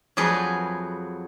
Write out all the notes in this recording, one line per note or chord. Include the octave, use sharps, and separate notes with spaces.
F2 F#3 G#4 B4